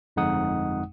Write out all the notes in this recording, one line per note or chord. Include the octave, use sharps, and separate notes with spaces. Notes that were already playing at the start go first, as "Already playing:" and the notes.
G1 F2 G#3 D#4 F#5 D#6